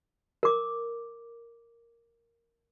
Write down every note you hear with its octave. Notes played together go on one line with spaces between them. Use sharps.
A#4 D6